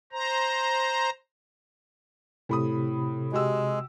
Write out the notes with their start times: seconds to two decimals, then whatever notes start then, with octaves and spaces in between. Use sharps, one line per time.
0.12 C5 A#5
2.49 A2 C3 B5 D#6
3.33 G#3 F#4 G4 E6